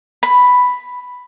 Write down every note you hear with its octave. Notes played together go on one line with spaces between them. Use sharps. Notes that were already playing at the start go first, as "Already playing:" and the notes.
B5